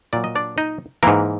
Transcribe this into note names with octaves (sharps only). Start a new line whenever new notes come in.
A#2 F#3 D5
D#5
D4 D5
D#4 D#5
G#2 E3 A#3 A#4